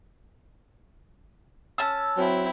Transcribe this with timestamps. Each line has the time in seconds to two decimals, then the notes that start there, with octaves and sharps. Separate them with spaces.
1.78 C#4 A5 E6
2.17 F#3 C4 E4